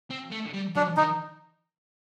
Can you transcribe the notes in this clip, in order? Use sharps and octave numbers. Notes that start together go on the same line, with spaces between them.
C4
A3
G3
F#3 D4
D#3 D#4